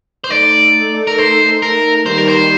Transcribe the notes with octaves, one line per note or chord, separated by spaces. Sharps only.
C5
A3 D#4 A4 D5
A#4
C5
A#4
D#3 G3 A#3 C5
A#4
C5